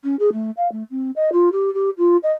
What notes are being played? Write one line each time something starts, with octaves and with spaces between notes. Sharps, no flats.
C#4
G#4
A3
F5
A3
C4
D#5
F4
G4
G4
F4
D#5